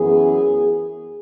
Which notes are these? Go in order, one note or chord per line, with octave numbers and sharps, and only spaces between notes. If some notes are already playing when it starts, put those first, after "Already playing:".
Already playing: F#2 E3 B3 G#4